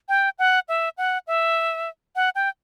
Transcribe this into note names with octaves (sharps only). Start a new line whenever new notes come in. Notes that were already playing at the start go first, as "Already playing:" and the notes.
G5
F#5
E5
F#5
E5
F#5
G5